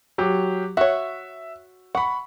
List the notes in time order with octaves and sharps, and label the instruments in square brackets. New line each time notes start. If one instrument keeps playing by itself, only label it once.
[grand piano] F#3 G4
[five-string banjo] F#4 C#5 [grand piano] E5
[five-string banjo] F#5 [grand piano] B5 C#6